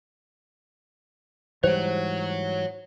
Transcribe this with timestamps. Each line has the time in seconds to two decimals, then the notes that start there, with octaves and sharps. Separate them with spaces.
1.64 G#2 E3 G3 C5 C#5 F#5